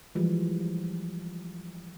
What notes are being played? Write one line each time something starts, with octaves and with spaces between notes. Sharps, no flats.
E3 F3 G3 G#3